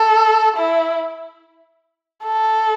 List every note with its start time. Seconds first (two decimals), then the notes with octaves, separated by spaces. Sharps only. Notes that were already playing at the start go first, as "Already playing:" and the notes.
Already playing: A4
0.57 E4
2.23 A4